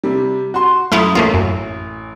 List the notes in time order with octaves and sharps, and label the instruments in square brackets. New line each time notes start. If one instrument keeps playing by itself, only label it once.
[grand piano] C3 G3
F#4 C6
[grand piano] F#2 D#6 [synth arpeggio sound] A3 E4 F4
[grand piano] A1 [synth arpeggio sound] A3 A#3 F4
[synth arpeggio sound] F#2